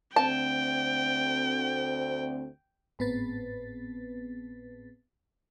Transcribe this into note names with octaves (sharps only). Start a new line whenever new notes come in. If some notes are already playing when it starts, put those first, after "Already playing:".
D2 C4 G5 A5
G#1 A2 B3 C4 B4 A6